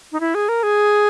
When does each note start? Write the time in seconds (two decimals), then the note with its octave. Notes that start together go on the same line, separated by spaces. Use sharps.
0.12 D#4
0.20 E4
0.35 G#4
0.49 A#4
0.63 G#4